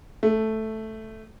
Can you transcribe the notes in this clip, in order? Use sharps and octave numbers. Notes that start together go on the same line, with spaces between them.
A3